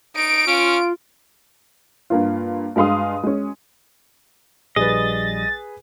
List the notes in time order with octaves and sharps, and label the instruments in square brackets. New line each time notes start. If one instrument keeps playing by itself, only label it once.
[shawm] D#4 [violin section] D7
[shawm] C#4 [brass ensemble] F4
[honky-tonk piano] G2 A#3 F4
G2 G#3 F5 C6 D#6
G#3 C#4
[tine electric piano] A#1 G3 [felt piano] G#4 B4 [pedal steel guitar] D#5 [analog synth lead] A6